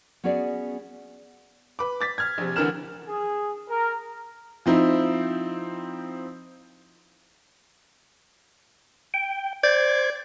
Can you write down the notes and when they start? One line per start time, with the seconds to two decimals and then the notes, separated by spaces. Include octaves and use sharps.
0.24 B3 C#4 F#4 G#4 D5
1.79 B4 D6
2.01 D6 A6 B6
2.18 F6 G#6
2.38 A#1 C3
2.56 D2 D3 E3 A#4 F6 E7
3.06 G#4
3.69 A#4
4.66 F3 C4 D#4 E4
9.14 G5
9.64 C5 D5 G#6